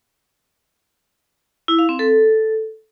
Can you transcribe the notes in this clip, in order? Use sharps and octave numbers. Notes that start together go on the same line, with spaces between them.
E4
F5
C4
A4